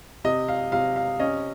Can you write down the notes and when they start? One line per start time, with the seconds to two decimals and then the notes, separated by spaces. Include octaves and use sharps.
0.24 C3 D#5
0.48 F5
0.72 C3 F5
0.96 F5
1.20 C#4 D#5